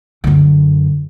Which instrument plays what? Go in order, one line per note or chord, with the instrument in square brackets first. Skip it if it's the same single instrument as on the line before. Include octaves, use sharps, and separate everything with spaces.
[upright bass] F#2 D3